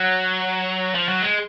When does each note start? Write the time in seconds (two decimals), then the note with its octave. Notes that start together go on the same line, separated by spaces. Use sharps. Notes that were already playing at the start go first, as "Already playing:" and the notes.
Already playing: F#3
0.94 F3
1.09 F#3
1.22 G#3